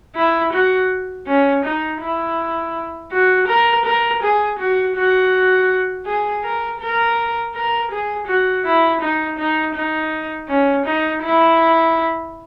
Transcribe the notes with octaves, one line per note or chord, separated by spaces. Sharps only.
E4
F#4
C#4
D#4
E4
F#4
A#4
A#4
G#4
F#4
F#4
G#4
A#4
A#4
A#4
G#4
F#4
E4
D#4
D#4
D#4
C#4
D#4
E4